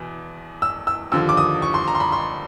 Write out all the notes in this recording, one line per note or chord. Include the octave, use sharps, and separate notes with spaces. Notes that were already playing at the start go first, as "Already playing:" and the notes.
Already playing: E2 B2
E6
E6
D#2 D3 F3 E6
D6
D#6
C#6
C6
A#5
C6
B5
C6